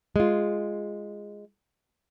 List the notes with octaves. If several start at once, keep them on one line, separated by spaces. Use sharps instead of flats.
G#3 F4